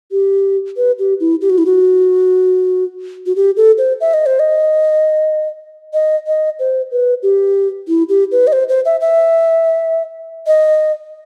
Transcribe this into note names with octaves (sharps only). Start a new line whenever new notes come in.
G4
B4
G4
E4
G4
F#4
E4
F#4
F#4
G4
A4
C5
E5
D#5
C5
D#5
D#5
D#5
C5
B4
G4
E4
G4
B4
D#5
C5
C5
E5
E5
D#5